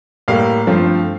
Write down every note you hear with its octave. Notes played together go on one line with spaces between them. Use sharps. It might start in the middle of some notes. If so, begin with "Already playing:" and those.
A2 G3 A#3 F5
G2 F3 A3 C4